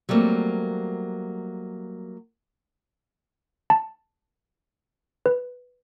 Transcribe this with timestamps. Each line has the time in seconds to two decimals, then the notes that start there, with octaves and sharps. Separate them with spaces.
0.09 F#3 G3 A3 A#3 C4
3.70 A5
5.26 B4